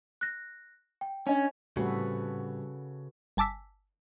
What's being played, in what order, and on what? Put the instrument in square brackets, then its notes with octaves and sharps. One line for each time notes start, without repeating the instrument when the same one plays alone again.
[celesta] F#6 A#6
G5
[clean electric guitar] C#4 [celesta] D4 D#5
[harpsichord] C2 E3 [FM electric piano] A2 [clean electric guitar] C#3 [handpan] F#4 A4 B4
[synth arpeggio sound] G1 G#5 A5 D6 E6 B6